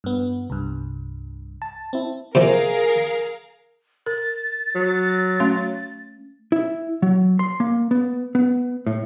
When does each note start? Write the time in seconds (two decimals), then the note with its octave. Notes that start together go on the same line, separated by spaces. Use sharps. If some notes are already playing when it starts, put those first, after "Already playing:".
0.04 G2 B3
0.50 C2 G2
1.62 A5
1.93 C4 E4
2.35 C3 F3 G#4 A#4 F5
4.06 A#4 A6
4.75 F#3
5.40 A3 C#4 C6
6.52 E4
7.02 F#3
7.39 C6
7.60 A#3
7.91 B3
8.35 B3
8.87 A2